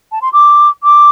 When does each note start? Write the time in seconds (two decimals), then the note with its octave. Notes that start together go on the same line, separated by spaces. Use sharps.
0.12 A5
0.22 C6
0.33 D6
0.83 D6